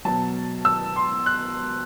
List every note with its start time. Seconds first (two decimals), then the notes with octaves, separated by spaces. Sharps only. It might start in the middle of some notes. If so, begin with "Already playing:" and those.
0.05 B2 F#3 A5
0.65 E6
0.96 C6
1.26 F#6